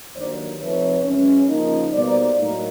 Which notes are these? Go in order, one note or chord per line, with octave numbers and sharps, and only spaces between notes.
G2 D#3 F#3 A#3 D#4 C5 D5
C3 F3 A3 C4 D#4 B4 C#5
F#2 C#3 E3 G#3 C#4
C#3 F3 A#3 D#4
B2 G3 A#3 D#4 C5 D5
A2 F#3 A#3 D#4